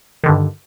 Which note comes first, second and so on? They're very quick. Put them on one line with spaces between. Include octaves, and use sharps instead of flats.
D#3 D3 G2